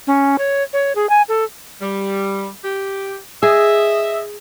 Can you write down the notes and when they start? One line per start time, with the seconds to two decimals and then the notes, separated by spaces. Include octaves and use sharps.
0.07 C#4
0.38 C#5
0.73 C#5
0.95 G#4
1.10 G#5
1.29 A4
1.81 G3
2.63 G4
3.43 G#4 D#5 E5